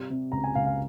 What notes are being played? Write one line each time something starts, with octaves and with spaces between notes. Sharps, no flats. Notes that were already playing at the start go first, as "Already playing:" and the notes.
Already playing: C3 G3
C3
C#2 A#5
G#5
C#2 F5
F5